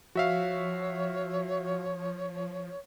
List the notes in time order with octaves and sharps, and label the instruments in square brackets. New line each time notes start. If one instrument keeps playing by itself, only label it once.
[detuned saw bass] F3 [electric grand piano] F#4 E5 F5 [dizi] C#5